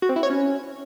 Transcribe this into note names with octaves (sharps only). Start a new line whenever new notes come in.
F#4
C4
E4
C#5
C#4